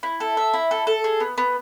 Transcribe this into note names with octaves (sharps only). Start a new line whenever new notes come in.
E4
A4
E5
E4
A4
A4
G#4
B3
B3